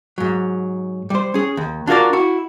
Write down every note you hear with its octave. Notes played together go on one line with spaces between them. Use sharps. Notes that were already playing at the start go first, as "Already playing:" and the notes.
G#2 F#3
G3 C5
C#4 G#4
D#2
D4 F4 F#4 G#4 A#4 D5
E4 F#4